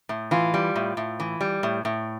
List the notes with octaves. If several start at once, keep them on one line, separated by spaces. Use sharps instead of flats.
A2
E3 F4
G3
A2
A2
E3
G3
A2
A2